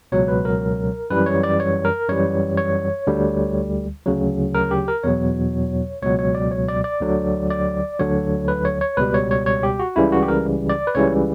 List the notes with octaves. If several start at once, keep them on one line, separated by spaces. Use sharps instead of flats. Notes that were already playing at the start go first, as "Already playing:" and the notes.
C#2 B2 F#3 C#5
B4
A#4
F#2 E3 G3 B4
C#5
D5
C#5
A#4
F#2 E3 G3 C#5
C#5
D2 D3 G3
D2 C#3 F#3
A#4
G4
A#4
E2 B2 F#3 C#5
C#2 B2 F#3 C#5
C#5
D5
C#5
D5
D5
D2 D3 F#3
D5
D2 D3 F#3 C#5
B4
C#5
C#5
C#2 B2 G3 B4
C#5
C#5
C#5
G4
F#4
C#2 C#3 E3 G3 E4
F#4
G4
A#4
D5
B4
C#2 C#3 E3 G3 C#5